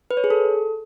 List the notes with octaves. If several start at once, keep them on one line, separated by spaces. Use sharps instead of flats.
B4
C#5
G#4
A4